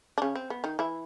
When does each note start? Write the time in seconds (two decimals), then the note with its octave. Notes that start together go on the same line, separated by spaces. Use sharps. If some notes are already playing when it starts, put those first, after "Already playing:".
0.18 D4
0.22 C#3 C#4
0.35 C4
0.50 B3
0.64 D#3 D#4
0.79 E3 E4